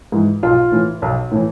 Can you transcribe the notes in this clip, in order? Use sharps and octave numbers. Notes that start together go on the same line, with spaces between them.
G#2 E3
B1 F4
A2 E3
B1
A2 E3